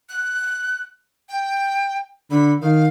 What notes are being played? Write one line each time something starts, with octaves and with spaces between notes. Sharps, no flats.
F#6
G5
D3 B5
D#3 F5